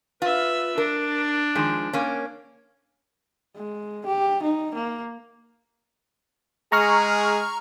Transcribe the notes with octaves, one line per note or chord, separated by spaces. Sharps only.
F4 B4 E5
D4 A#4
D#3 F3 G#3
A#3 C#4
G#3
G4
D#4
A#3
G#3 G#4 A#5 C#6 F6